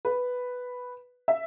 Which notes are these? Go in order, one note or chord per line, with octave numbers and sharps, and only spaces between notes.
B4
E5